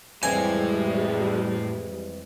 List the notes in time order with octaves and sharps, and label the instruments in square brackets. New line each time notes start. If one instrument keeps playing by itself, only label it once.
[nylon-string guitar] F2 E3 C4 [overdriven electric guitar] A2 [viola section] G3 G#3 [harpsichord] G#5